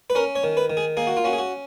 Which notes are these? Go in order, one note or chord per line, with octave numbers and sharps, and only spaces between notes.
B4
C#4 A#4
C#5
D#3
B4
D#3
G#4
A#3 G#4
F#4
F4
C#4 F#4
G#4
F#4